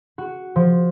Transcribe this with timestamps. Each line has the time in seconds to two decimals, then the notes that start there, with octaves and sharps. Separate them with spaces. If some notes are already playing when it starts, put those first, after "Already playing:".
0.18 F#4
0.56 F3